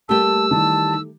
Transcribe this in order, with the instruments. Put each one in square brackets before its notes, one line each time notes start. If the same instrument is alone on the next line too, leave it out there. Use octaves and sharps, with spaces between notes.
[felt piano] G3 A#3 [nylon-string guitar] A3 G4 [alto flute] A5 [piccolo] E6
[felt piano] D#3 E3 G3 [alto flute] A5